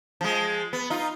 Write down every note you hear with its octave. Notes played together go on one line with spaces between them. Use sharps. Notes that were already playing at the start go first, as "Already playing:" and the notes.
F3 G#3
B3
D#4 F4